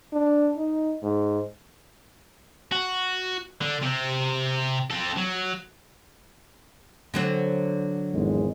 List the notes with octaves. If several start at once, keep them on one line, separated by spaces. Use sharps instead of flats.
D4
D#4
G#2
F#4
D3
C3 C4
C4 A4
F#3
D3 F#3 C4
G#1 E2 G#3